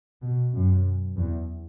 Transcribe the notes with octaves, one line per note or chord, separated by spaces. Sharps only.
B2
F#2
E2